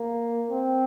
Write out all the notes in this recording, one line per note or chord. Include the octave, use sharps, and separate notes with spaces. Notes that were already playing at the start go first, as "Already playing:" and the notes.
Already playing: A#3
C4